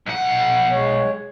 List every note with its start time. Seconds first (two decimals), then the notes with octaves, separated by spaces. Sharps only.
0.07 B1 F#5
0.70 G#3 C#5